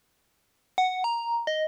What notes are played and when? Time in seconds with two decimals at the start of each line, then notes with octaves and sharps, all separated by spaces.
0.78 F#5
1.04 A#5
1.47 D#5